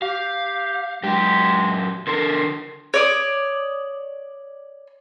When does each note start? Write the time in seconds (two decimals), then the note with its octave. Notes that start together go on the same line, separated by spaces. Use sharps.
0.02 G4 F5
1.03 F#2 G#3 G4
2.07 D3 A4 A#4 C6
2.94 C#5 D5 D#6